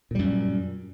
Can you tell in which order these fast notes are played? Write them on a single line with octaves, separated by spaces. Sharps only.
A#2 G3 F#2